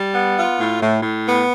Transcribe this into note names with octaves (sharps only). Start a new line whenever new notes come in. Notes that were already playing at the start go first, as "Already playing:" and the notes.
Already playing: G3
B3
F4
A2
A2
A2
B3